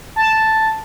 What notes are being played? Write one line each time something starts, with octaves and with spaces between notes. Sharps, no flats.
A5